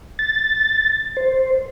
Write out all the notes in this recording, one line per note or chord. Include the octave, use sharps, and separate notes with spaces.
A6
C5